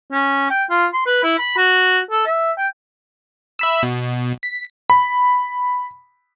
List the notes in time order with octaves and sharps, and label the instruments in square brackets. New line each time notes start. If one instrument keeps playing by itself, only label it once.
[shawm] C#4
G5
F4
C6
B4
E4
B5
F#4
A4
E5
G5
[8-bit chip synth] E5 B5 E6
B2
B6
[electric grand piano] B5